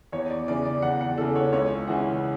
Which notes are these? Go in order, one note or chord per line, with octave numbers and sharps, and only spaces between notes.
E2 C#5
D5
C#3 E3 D5
D5
E2 F#5
F#5
C#3 E3 A4
C#5
C#2 C#5
C#3 E3 F#5